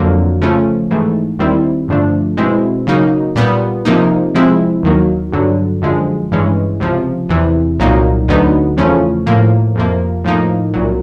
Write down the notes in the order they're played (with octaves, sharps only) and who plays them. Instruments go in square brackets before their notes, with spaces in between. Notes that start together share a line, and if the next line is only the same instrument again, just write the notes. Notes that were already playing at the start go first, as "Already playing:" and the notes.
Already playing: [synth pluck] F2 D3 F#3 A#3
C#3 F3 A3 C#4
G#2 E3 A3
D#2 D#3 G3 C4 E4
G2 D3 F3 A3 D4
B2 G#3 C4 E4
C#3 F#3 A#3 D#4
A#2 G3 B3
C3 F3 A#3 D#4
C3 F3 G#3 C4 E4
D#2 D#3 F#3 A#3
G2 D3 F#3
F#2 D3 F3 G#3
G2 E3 G#3 C#4
C#2 C3 F3
E2 C3 E3
C2 A#2 F#3 A#3 D#4
D2 D3 F#3 B3 D#4
E2 C#3 F3 A3 C#4
A2 F3 A#3
F2 C3 F3 A#3
A2 F3 A#3 D#4
C2 A#2 F#3